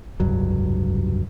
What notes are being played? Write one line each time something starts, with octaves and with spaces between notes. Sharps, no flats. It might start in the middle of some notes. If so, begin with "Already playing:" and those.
F1 C#2 G2 F#3